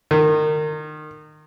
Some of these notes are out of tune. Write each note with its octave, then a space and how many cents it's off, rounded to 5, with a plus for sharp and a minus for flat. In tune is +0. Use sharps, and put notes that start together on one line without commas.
D#3 -30